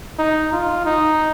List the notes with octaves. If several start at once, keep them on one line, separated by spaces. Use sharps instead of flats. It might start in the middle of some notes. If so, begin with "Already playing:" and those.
D#4
F4
D#4